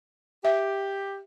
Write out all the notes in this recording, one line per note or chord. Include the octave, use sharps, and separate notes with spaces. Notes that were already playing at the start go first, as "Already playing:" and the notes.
G4 E5